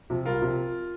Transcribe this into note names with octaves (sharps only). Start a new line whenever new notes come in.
C3 F3
C2 F4 A#4
C3 F3